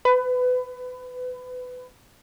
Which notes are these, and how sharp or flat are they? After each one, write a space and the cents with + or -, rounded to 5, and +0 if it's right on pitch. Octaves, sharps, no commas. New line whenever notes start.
B4 +25